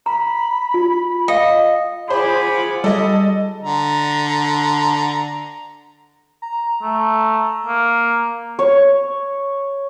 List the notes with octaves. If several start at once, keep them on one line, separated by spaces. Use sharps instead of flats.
A#5 B5
F4
D#5 F5 G5
F4 G#4 C5 F#5 B5 D6
G3 A4 D#5
D3 A#5
A#5
A3
A#3
C#5